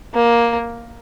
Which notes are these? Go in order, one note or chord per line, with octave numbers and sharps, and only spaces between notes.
A#3